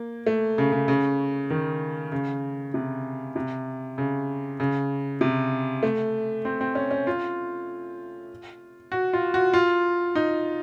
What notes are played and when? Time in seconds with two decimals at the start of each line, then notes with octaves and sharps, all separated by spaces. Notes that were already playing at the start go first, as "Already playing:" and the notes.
Already playing: A#3
0.26 A3
0.58 C#3
0.72 C#3
0.88 C#3
1.50 D#3
2.12 C#3
2.74 C3
3.36 C3
3.98 C#3
4.60 C#3
5.21 C3
5.83 A3
6.45 C4
6.61 C4
6.75 C#4
6.91 C#4
7.07 F4
8.92 F#4
9.13 F4
9.34 F#4
9.54 F4
10.15 D#4